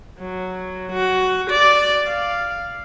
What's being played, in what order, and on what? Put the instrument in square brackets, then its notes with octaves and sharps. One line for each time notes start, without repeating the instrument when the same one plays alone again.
[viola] F#3
F#4
D5
F5